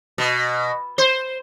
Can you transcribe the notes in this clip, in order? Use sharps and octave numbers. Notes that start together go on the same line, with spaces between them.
B2
C5